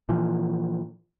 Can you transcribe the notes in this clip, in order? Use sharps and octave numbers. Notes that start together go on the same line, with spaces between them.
A#2 E3 F3